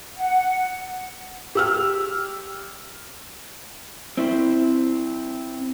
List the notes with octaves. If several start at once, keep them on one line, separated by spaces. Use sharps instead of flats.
F#5
G4 E6 F6
C4 E4 C5